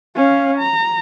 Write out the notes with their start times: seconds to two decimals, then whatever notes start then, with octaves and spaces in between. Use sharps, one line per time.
0.15 C#4 F5
0.58 A#5